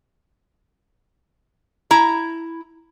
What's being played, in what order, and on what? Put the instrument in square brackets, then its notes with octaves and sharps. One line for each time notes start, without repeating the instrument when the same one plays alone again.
[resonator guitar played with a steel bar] E4 A#5